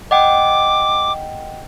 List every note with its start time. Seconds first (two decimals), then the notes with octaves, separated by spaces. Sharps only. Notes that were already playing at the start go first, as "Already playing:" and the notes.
0.11 D#5 F#5 G5 D6